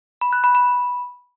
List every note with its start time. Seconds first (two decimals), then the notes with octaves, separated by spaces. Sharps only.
0.21 B5
0.33 F#6
0.44 B5
0.55 B5